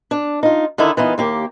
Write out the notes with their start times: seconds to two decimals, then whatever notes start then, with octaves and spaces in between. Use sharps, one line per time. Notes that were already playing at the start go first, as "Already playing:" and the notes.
0.11 D4
0.43 D#4 F4
0.78 D3 D#3 D#4 E4 A4
0.97 E3 B3 D#4 F4
1.18 D#2 A#3 G4